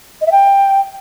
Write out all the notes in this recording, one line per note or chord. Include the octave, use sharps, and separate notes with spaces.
D#5
E5
G5